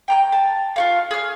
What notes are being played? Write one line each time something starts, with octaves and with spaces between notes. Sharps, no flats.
G5 A#5 G6
A5
F4 F#4 F5
G#4 F6